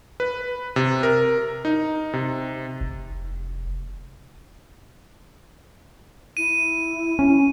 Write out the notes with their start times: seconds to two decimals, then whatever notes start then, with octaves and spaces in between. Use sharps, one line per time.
0.20 B4
0.76 C3
1.03 A#4
1.65 D#4
2.13 C3
2.81 F1
6.37 E4 D#7
7.19 C#4